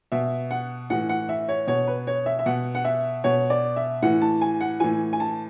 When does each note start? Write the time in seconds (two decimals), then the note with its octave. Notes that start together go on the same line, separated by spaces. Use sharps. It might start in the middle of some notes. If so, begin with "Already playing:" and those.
0.12 B2 E5
0.51 F#5
0.90 A2 E3 F#5
1.09 F#5
1.29 E5
1.49 C#5
1.67 B2 C#5
1.88 B4
2.07 C#5
2.26 E5
2.39 E5
2.46 B2 F#5
2.75 F#5
2.85 E5
3.24 B2 C#5
3.50 D5
3.76 E5
4.02 A2 E3 F#5
4.22 A5
4.41 G#5
4.61 F#5
4.80 A2 E3 G#5
5.13 G#5
5.20 A5